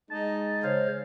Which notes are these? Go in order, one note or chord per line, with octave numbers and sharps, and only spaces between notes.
G#3 D#4 A5
C#3 C5 C#5 F5